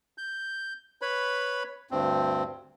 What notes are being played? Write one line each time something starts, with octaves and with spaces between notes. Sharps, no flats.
G6
B4 C#5 B5
D2 G2 C4